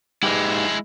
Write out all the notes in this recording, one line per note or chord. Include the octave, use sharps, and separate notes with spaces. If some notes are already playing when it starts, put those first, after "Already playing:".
G#2 G#3 E4 G4